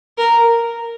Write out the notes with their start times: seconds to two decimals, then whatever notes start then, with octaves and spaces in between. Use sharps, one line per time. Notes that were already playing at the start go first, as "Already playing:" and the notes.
0.18 A#4